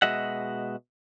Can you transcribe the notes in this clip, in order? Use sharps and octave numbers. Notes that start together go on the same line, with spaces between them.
B2 G#3 F#4 D#5 E5 F#5